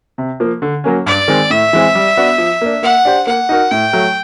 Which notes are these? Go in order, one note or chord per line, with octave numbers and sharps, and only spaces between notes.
C3
F3 A#3
D3
F#3 A#3 C#4
G2 D5
D#3 G#3 C4
A2 E5
E3 G#3 C4
G3
B3 D4 F#4
F3
A#3 D4
A#3 F#5
D4 G4 C5
A#3 F#5
D#4 F#4 A#4
A2 G5
F#3 A3